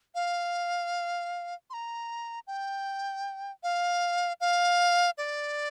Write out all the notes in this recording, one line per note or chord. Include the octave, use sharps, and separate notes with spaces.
F5
C6
A#5
G5
F5
F5
D5